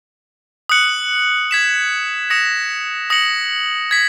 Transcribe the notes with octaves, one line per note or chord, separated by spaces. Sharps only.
D#6 F#6 C#7 F#7
G#6 B6 E7
D#6 A#6 C#7 E7
D#6 A#6 C#7 F#7
G#6 B6